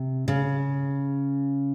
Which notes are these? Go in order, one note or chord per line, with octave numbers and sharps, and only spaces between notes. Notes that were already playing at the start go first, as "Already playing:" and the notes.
Already playing: C3
C#3